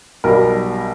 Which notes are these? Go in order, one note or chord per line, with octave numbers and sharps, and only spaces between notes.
B1 B2 G3 A#4